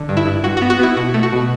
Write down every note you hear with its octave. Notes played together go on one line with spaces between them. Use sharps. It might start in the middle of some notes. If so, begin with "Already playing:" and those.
Already playing: D3
G2
E4
G2
G2 F#4
F#4
B3
F#4
B3 E4
B2 F#4
A3
F#4
B2